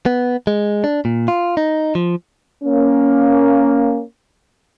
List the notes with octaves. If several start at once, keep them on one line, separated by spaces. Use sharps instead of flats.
B3
G#3
D4
A#2
F4
D#4
F3
A#3 C#4